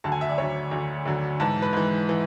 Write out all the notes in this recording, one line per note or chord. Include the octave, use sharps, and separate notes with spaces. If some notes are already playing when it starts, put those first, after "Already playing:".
D2 D3 F#3 A5
G#5
E5
D5
D2 D3 F#3 C#5
D2 D3 F#3
D2 D3 F#3
G#2 E3 A5
B4
G#2 E3
E3